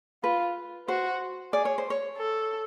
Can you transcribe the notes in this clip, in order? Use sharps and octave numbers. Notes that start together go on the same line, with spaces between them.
F4 B4
F#4 C5
G#4 D5
C#5
C5
C#5
A4